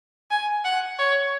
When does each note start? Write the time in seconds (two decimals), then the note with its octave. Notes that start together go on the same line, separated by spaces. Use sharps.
0.31 G#5
0.64 F#5
0.98 C#5